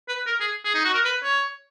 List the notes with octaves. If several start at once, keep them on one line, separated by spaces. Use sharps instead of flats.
B4
A#4
G#4
G#4
D#4
F#4
A#4
B4
C#5